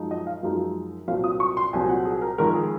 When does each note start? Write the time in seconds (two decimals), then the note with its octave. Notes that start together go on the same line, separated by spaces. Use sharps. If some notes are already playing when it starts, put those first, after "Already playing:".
Already playing: F#2 F3 G#3 D#4
0.11 D#5
0.27 F5
0.43 F#2 F3 G#3 D#4
1.08 C2 A#2 F#3 C4 F5
1.24 D#6
1.40 C#6
1.57 C6
1.73 C2 A#2 F#3 C4 G#5
1.89 F#5
2.05 G#4
2.22 A#4
2.38 F2 D#3 G#3 A#4
2.55 G#4